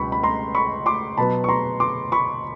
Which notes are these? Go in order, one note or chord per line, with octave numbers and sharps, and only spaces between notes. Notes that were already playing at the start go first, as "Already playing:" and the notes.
Already playing: C#2 B2 G3 B5 C#6
B5
A#5 C6
B5 C#6
C6 D6
B2 F#3 B3 A5 B5
C#6
A#5 C6
C6 D6
B5 C#6